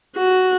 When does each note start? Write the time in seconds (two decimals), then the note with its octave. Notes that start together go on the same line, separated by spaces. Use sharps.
0.16 F#4